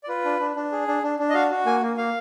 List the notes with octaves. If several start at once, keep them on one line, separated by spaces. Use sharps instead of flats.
D5
F4 B4
D4
D4
D4
G#4
D4
D4
D4
D#5
F#4 F5
F#4
A#3 G#5
A#3
A#3 F5